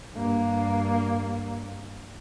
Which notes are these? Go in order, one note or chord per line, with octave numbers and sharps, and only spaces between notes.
G2 A#3